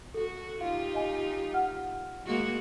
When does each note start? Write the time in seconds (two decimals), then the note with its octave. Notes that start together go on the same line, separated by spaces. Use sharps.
0.14 F#4 A4
0.61 D#4 F4 G4 F5
0.94 D#5 G#5
1.54 F#5 F6
2.26 G#3 A#3 F#4